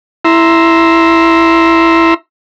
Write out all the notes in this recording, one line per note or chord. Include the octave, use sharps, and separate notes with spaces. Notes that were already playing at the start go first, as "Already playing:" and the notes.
E4 A#5 C6 E6